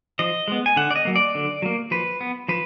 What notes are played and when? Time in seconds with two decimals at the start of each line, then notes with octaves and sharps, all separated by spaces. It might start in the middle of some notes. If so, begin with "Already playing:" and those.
0.19 F3 D#5
0.48 G#3 B3
0.66 G#5
0.76 D3 F#5
0.91 D5
0.96 D#5
1.05 F#3 A#3
1.16 D5
1.35 D3
1.62 F#3 A#3
1.91 F3 B4
2.21 B3
2.48 F3 B4